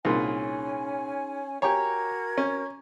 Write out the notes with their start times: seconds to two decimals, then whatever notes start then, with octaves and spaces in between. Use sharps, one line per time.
0.05 C2 A#2 C#4 D#4 G#4 G#5 C6
1.62 F#4 G4 A#4 C#5 G#5 A#5 D6 G#6
2.38 C#4